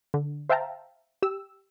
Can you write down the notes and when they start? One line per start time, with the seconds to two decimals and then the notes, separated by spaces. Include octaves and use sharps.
0.14 D3
0.49 C5 E5 F5 G5 A5 A#5
1.22 G4 E6